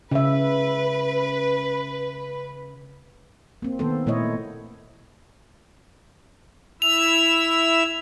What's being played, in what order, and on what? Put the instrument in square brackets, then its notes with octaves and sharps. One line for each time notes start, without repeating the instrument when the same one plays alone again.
[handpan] C#3 E5 [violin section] B4
[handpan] A#3 C4
D#3 A#3 B3 A4 C5
A#2 A3 E4 C#5 D#5
[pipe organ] E4 E5 E6 [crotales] F7